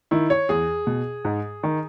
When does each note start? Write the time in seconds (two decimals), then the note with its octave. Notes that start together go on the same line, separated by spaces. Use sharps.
0.11 D#3 E4
0.30 C#5
0.49 E2 G#4
0.87 B2
1.25 G#2
1.63 D#3